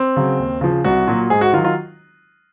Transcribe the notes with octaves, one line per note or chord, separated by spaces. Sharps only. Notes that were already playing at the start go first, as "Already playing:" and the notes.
Already playing: C4
C#3 F#3
D#2
C#3 F3
C2 F#4
A#2 F#3
G#2 G#4
F#4
D#3 F#3 F4
F4